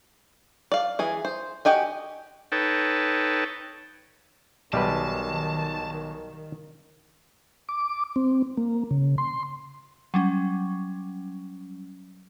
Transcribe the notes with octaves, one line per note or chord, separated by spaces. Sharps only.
D5 F5
E3 G#4
C5
F#4 G4 D#5 G#5
D#4 A4 B4 C#5 G5 A5
B1 D#3 G3 G4 B4 A5
D6
C4
A#3
C#3
C6
F#3 G3 C#4